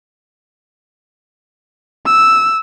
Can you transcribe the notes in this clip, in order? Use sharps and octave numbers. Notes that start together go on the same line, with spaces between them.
E6